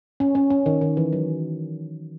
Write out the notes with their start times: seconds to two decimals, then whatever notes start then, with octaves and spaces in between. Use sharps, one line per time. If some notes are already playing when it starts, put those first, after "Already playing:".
0.20 C#4
0.35 C#4
0.50 C#4
0.66 D#3
0.81 D#3
0.97 E3
1.13 F#3